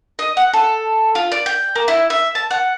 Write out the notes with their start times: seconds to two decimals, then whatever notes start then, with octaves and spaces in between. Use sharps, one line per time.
0.19 D#5
0.37 F#5
0.53 A4
1.15 F4
1.32 D5
1.46 G5
1.76 A#3
1.88 E4
2.10 E5
2.35 A5
2.51 F#5